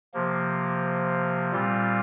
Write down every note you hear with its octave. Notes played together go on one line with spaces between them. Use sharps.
C3 F3 A#3
A#2 G3 C4 F4